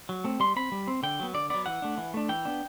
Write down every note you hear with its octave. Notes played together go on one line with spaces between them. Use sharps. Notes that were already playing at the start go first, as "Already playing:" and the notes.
F#3
A3 C4
G3 C6
C4 B5
G3
C4
D3 G5
F#3 B3
D3 D5
F#3 B3 D5
E3 F#5
A3 D4
E3
A3 D4
E3 G5
B3 D4